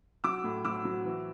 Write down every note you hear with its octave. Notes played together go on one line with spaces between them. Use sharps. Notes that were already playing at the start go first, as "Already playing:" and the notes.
F#3 D6 E6
A2
F#3 D6 E6
F#3
E3